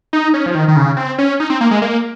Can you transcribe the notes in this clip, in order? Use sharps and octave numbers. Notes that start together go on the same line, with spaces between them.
D#4
C#4
F3
D#3
D#3
C#3
C4
C#4
D#4
C4
A#3
G#3
A#3